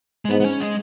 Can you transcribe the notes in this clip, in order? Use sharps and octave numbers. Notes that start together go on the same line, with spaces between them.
G#3
G#2 B3
B3
C#4
G#3